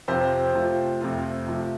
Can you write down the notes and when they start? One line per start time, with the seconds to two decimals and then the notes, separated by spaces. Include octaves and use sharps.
0.08 F2 C3 F3 C4 F4 G4 C5
0.54 C3 F3 A3 F4
1.01 F2 C3 A3 C4 F4
1.47 C3 F3 A3